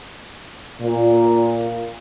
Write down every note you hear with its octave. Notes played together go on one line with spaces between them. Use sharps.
A#2